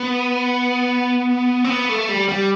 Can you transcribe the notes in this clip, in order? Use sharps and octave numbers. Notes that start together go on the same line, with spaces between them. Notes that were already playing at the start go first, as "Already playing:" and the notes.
Already playing: B3
C4
B3
A3
G3
G3